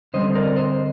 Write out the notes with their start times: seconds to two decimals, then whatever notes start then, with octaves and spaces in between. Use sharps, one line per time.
0.14 D3 G3 C4 C5 D#5
0.35 A#4 D5
0.56 C5 D#5